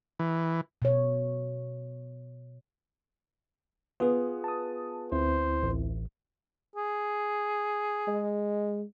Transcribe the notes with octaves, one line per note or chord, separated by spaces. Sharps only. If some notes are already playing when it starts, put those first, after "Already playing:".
E3
B2 C#5
B3 F4 G#4
A5 D#6
D2 C4 E4 C5
A1
G#4
G#3